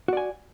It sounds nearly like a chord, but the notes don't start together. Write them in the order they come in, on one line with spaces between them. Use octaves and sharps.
F#4 D5 G#5